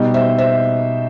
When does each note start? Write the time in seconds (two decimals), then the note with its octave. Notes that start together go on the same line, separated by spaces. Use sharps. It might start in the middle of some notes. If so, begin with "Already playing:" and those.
Already playing: B2 G3 D#4 D#5
0.14 C5 E5
0.38 C5 E5